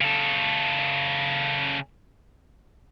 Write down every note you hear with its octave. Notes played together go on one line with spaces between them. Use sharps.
C#3 A4